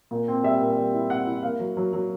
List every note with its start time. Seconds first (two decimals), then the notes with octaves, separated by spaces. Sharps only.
0.11 A#2
0.28 C4
0.44 G3 E5
0.61 A#2
0.77 G3
0.94 E4
1.10 C4 F#5
1.27 E4
1.43 A#3 F5
1.60 F#3
1.77 F#3
1.93 F#3